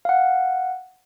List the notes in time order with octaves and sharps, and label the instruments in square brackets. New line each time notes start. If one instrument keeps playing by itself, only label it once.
[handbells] F5 F#5